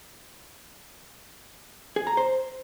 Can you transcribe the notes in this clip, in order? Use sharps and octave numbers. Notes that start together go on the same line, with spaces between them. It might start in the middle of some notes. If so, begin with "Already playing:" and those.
G#4
A#5
C5